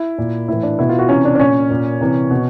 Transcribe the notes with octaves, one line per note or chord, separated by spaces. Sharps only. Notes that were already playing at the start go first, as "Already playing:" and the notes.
Already playing: E4
A#2
A2 E3 E4
D4
B2 E4
F4
F#4
C3 E3 C#4
D4
D4
A#2 C#4
A#2
C3 E3
B2